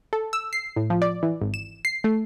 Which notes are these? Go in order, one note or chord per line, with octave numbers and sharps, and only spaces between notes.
A4
E6
C7
A2
F3
D5
E3
G#1
E7
C7
A3